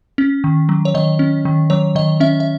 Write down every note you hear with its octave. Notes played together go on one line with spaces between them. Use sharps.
C#4
D#3
F#3
C#5
D#3 D#5
C#4
D#3
F#3 C#5
D#3 D#5
C#4 E5
E5